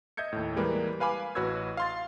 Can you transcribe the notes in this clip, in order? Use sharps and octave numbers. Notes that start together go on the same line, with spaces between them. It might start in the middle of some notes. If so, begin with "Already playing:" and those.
D#5 E5 G6 G#6 C#7
D#2 A2
E3 G3 G#3 A#3 B4
B4 F5 G#5 B5 D6
A1 F#4 B4 C#5 E6 G#6
F5 C6 A6